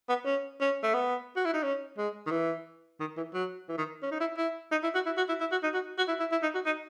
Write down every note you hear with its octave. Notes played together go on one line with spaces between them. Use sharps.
B3
C#4
C#4
A3
B3
F#4
E4
D#4
C#4
G#3
D#3
E3
D#3
E3
F#3
E3
D#3
C#4
D#4
E4
E4
D#4
E4
F#4
E4
F#4
E4
E4
F#4
D#4
F#4
F#4
E4
E4
E4
D#4
F#4
D#4